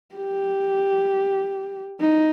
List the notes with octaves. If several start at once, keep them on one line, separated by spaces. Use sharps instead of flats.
G4
D#4